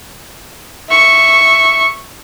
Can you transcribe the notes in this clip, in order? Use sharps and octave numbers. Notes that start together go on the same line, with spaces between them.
E5 C#6